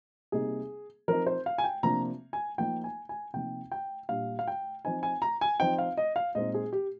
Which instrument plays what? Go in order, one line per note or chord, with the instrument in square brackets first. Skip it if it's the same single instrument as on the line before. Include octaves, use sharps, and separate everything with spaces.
[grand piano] C3 G3 A#3 D#4 G#4
F3 C4 D#4 A#4
C5
F5
G#5
G5
C3 F3 A#3 D4 A#5
G#5
F3 A#3 D#4 G5
G#5
G#5
C3 F3 A#3 D#4 G5
G5
A#2 G3 D4 F5
F5
G5
F3 C4 D#4 G#5
G#5
A#5
G#5
F3 C4 D#4 G5
F5
D#5
F5
A#2 G#3 C4 D#4 D#5
G#4
G4